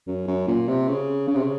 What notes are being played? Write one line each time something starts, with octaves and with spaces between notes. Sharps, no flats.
F#2
F#2
A#2
C3
C#3
C#3
C3
C#3